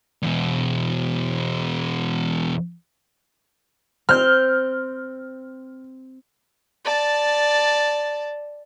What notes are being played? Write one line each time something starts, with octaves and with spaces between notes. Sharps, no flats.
E2 B2
C4 F6 G6
D5 A5